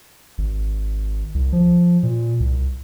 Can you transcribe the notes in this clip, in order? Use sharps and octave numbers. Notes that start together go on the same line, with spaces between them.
G#1
C2
F3
A#2
C2